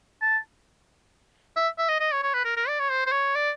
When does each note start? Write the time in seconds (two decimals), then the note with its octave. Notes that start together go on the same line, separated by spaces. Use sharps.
0.21 A5
1.56 E5
1.78 E5
1.89 D#5
2.00 D#5
2.12 C#5
2.23 C#5
2.34 B4
2.45 A#4
2.57 A#4
2.68 D5
2.79 C#5
2.90 C5
3.06 C5
3.12 C#5
3.35 D5